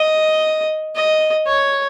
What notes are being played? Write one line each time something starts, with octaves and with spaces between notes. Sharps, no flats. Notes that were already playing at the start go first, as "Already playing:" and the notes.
Already playing: D#5
D#5
C#5